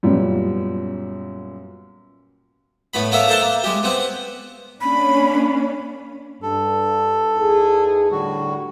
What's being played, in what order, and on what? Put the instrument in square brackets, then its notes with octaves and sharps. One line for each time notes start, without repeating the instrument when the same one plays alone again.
[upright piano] F#2 A#2 G3 B3
[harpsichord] A2 B3 B5
A#3 B3 A4 A#4 C#5 E5
E4 A4 C5 F#5 A5 C6
A#3
G#3 G4
B3 C4 F#5
[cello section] A#3 C#4 D4 [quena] B5
[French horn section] G2 [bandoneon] A4
[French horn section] E2 D#4 G#4
[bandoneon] A2 F#4 [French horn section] D3 G3